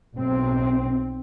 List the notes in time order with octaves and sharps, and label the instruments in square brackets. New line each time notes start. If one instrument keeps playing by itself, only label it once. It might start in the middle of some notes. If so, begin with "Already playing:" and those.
[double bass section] B1 C4